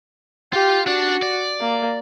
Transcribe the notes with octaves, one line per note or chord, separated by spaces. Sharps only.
F4 G4
D4 F#4 D5
D5
A#3